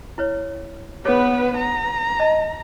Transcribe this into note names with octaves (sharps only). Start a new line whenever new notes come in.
E4 B4 C#5
B3 D#4 G#4 B4 C#5
A#5
D#5 A5